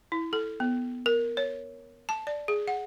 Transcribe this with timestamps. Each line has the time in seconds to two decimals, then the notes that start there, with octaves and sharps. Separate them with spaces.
0.12 E4
0.33 A4
0.60 B3
1.06 A#4
1.37 C#5
2.09 A5
2.27 D5
2.48 G#4
2.68 F#5